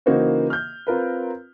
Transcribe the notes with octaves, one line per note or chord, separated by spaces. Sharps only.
C#3 E3 A#3 D#4 F#4 C5
F6 G6
C4 F4 A#4 B4